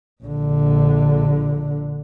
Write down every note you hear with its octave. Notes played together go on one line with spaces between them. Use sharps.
A#1 D3